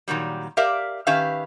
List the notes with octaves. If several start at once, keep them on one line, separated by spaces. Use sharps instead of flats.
A#2 D#3 F#3 G3
G4 A#4 D5 E5 F5
D#3 C#4 G4 B4 E5 F5